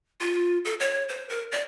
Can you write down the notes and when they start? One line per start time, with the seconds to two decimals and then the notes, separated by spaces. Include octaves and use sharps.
0.20 F4
0.65 A4
0.80 C#5
1.09 C5
1.29 A#4
1.51 D5